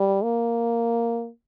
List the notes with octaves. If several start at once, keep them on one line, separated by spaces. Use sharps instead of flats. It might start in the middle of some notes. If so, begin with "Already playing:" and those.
Already playing: G3
A#3